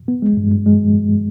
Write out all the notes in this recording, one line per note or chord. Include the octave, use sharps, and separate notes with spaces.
B3
G#3
G2
G2
G#3